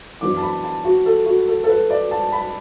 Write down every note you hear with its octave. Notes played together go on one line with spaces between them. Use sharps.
F#2 E3 B3 D4 D6
A5
B5
A5
F#4
A4
F#4
A4
A4
B4
D5
A5
B5